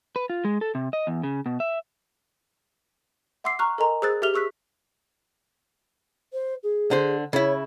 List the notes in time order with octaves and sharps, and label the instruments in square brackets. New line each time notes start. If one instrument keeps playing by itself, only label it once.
[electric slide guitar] B4
F4
G#3
A4
C3
D#5
E2
C#3
B2
E5
[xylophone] E5 F#5 C6 D6 E6 C7
A#5 C#6 F6 F#6
A4 A#4 D#5 G#5 A#5 C6
G#4 C5 E6 F#6 A6
G4 A4 E5 F6 F7 G7
G#4 C#6 E6 F#6 B6
[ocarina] C5
G#4
[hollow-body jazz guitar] D3 C5
[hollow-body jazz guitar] C#3 E4 [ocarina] C#5